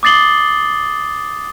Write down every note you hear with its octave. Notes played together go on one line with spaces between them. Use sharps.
D6 D#6 A6 C7 F#7 G7